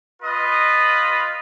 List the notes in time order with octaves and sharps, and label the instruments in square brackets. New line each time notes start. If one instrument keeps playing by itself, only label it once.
[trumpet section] F4 B4 D#5